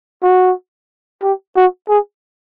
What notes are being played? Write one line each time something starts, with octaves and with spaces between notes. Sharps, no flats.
F#4
G4
F#4
G#4